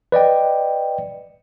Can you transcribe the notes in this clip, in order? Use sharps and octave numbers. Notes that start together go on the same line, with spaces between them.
B4 D5 D#5 G5